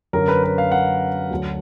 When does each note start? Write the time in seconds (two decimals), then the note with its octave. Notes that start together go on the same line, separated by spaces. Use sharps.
0.13 F#2 D3 F#3 A#4
0.28 B4
0.44 B4
0.58 F5
0.72 F#5
1.31 D2 D3 F#3